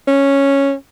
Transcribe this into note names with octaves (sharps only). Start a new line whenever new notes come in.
C#4